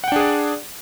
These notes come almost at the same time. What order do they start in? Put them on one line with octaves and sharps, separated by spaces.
F#5 G5 D4 G#4 D5